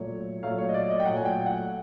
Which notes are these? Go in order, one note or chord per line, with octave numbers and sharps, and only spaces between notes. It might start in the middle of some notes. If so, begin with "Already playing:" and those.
Already playing: A#2 F#3 A3 C#5
A#2 F#3 A3 F5
C#5
D#5
D5
D#5
G5
A#2 F#3 A3 F#5
G#5
G5
G5
F#5